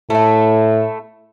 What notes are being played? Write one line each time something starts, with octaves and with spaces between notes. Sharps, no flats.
A2 A3 E4